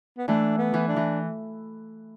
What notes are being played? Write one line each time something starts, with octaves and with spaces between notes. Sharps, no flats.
B3
E3 A3 D4
B3
E3
D4
E3